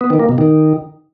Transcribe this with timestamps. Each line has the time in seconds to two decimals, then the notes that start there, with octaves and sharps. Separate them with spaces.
0.01 B3
0.10 D#3
0.19 A#3
0.29 B2
0.38 D#3